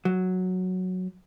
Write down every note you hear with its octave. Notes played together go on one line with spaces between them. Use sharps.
F#3